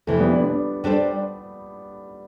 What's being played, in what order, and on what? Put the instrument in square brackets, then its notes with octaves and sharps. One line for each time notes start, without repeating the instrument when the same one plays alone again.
[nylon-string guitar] F2 C3 E3 [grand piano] A3
[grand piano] G3 B3
B3 D4
B3 D4
[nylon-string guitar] G3 D4 A4 C5